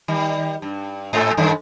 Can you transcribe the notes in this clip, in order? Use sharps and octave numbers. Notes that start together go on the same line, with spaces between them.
D#3 G3
G2
G#2 A4
F#2 D#3